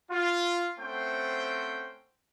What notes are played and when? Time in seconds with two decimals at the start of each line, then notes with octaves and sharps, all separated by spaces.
0.11 F4
0.78 A3 C4 C#4 C5 F#5 G5